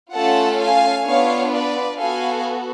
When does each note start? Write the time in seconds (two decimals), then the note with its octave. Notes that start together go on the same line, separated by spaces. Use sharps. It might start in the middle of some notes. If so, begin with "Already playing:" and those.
0.14 A3 C#4 F4 A4 F#5 A5
0.60 F5 G#5
1.06 B3 D4 F4 C#5 F5
1.52 B4 D5
1.98 B3 F#4 A4 F5 G#5